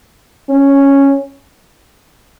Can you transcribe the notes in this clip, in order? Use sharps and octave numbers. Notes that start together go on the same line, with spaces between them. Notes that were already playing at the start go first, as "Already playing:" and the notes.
C#4